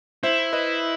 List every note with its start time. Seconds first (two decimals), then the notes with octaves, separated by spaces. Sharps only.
0.23 E4 C5 E5
0.53 B4 D#5